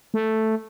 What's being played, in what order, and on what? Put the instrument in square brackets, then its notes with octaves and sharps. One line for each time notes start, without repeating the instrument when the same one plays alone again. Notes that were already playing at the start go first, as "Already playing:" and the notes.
[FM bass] A3